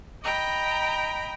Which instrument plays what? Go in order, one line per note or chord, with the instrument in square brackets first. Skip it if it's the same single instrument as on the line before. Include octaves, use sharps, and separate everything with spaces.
[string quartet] D#5 G5 A#5 B5